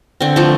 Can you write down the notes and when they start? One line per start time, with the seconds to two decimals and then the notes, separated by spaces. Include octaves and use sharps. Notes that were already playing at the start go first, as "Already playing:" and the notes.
0.21 D3 C4
0.36 F3 A3